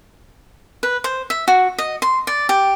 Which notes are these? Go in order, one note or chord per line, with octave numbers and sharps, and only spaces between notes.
B4
C5
E5
F#4
D#5
C6
D5
G4